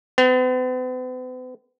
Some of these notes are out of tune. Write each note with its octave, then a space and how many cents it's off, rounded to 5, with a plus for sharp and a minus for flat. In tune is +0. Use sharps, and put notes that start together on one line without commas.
B3 +45